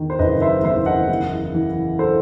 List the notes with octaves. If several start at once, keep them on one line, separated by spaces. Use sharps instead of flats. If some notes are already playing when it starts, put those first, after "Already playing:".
Already playing: E2 D#3
C5
F#1 B4 D#5
C5 E5
E2 C5 E5
D#5 F#5
E2
E3
A4 C5